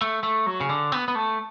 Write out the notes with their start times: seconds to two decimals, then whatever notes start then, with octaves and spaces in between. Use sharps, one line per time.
0.02 A3
0.23 A3
0.47 F#3
0.61 C#3
0.69 D3
0.92 B3
1.08 B3
1.15 A3